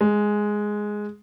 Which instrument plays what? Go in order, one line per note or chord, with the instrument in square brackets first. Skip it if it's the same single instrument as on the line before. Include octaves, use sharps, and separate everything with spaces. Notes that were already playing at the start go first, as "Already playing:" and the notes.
[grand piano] G#3